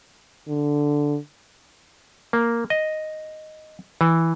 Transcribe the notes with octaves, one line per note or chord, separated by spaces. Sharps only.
D3
A#3
D#5
E3